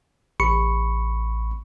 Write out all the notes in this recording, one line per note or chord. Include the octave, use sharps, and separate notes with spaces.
A1 B5 C#6 C#7